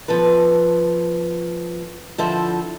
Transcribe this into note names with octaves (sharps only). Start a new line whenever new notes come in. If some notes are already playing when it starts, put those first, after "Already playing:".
F3 B3 A4 B4
D3 F3 E4 A4 C5